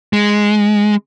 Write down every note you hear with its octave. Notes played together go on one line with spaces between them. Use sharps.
G#3